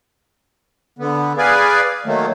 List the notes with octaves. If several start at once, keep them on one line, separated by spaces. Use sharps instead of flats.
D3 B3
G#4 B4 D5 F5 G#5
D#3 F#3 A3 A#3